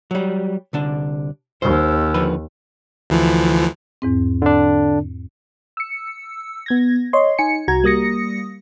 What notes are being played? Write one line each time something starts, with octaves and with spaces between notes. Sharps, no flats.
F#3 G3
C2 D3 D4
D#2 C5
D3 F3 B4
D2 E3 F3
E2 G#2 C4
D3 D4
E6 C#7
B3 G#6 A#6
C#5 D#5 C6
D#4 G#5 C#7
C2 F#4 A#5 G#6
G3 A#3 D#6 A#6 C#7